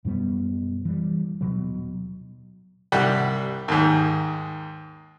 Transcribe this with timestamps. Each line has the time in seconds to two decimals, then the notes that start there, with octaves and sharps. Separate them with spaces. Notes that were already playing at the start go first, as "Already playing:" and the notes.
0.05 F#2 B2 G3 B3
0.85 E3 G3
1.41 D#1 B2 F#3
2.92 C2 G3 F#5
3.68 D#2 G#2